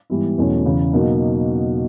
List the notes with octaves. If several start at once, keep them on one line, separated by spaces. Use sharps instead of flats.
G#2 E3 G3 B3 E4
E2 B2 F#3 A3 C#4
E2 C#3 E3
B2 F#3 A#3 D#4 F#4